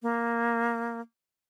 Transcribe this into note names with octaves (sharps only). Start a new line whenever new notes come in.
A#3